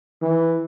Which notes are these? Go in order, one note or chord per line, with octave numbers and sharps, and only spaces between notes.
E3